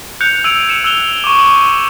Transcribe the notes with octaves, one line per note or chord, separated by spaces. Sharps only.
F#6 G6 C#7 F7
E6 G6 G#6 D7 D#7 F7
C#7 E7
E6 F#6 F7 G7
C#6 D6
F#7